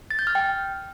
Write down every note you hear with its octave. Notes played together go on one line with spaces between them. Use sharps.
A6
G6
F6
G5